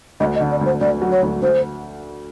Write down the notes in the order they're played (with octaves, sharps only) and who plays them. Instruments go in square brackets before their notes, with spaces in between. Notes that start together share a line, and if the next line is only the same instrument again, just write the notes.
[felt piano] D2 [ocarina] D#5
[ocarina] D#5
[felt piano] D3
[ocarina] D5
[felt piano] D2 [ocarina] C5
[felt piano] D2 [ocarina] D5
[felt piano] F#3
[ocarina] C#5
[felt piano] D2
[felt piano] D2 [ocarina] C5